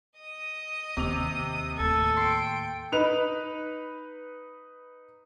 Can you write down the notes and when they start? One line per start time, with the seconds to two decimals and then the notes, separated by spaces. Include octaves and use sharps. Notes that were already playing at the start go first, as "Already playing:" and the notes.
0.19 D#5 D#6
0.97 D#2 C3 D6 F7
1.78 D#2 A2 A4 G#6
2.17 G5 C6 C7 D7
2.92 D#4 B4 F7